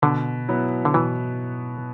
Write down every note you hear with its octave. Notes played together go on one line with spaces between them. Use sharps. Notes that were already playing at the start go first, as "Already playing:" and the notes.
B2 D3
F#3 B3 E4
D3
B2 E3